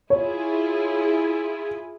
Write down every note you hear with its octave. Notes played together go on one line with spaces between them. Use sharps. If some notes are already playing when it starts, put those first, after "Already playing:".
E4 F4 G#4 C#5